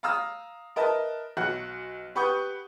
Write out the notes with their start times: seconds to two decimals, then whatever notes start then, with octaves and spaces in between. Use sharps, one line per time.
0.03 F5 A#5 D#6 E6
0.76 A#4 B4 D#5 E5 A5
1.37 B1 F#4 F#5 F#6
2.15 G4 B4 F#5 C#6 D#6 G6